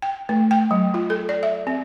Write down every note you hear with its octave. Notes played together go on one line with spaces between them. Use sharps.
G5
A3
G5
F#3
F4
A4
D5
E5
C4